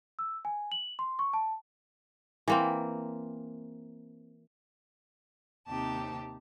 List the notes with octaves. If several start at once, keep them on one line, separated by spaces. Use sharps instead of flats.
E6
G#5
F#7
C6
C#6
A5
E3 A#3 C4
D#2 C3 C4 D#4 G4 A5